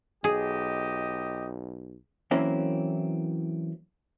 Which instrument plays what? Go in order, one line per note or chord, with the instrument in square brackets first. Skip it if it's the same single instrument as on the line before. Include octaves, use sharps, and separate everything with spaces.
[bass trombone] B1 [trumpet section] G4 D#5 [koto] G#4
[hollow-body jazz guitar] E3 F#3 A#3 C4 C#4 E4